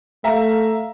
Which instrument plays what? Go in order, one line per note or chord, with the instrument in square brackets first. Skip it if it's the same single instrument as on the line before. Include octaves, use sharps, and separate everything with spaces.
[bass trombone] A3 [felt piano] E5 F5 A#5